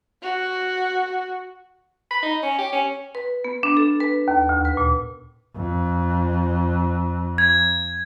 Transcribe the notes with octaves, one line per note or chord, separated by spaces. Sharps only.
F#4
B5
D#4
C#4
G4
C#4
B4
B3
D4
A4
B4
D#2
D2
B4
A#2
F2
G#6